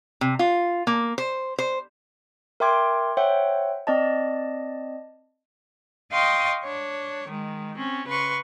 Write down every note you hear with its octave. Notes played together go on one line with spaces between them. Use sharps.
C3
F4
A#3
C5
C5
A#4 E5 G5 C6 D6 G#6
C5 C#5 E5 F#5 G5
C4 D5 D#5 A5
D#5 F5 G5 C6 C#6 D#6
D4 C#5
D#3 G#3
C4 C#4
C#3 B4 C6 C#6